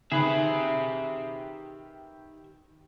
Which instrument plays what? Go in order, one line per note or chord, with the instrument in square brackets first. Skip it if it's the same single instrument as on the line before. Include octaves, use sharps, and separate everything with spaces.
[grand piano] D#3 [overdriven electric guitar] G4 E5 [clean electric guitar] G#4 B4